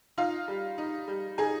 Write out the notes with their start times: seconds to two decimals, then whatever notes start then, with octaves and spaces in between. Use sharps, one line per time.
0.17 D#4 F4 F5
0.48 G3
0.78 D#4
1.08 G3
1.38 D#4 G#4 G#5